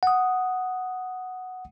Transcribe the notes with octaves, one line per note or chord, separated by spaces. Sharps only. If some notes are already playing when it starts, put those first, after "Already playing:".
F#5 D#6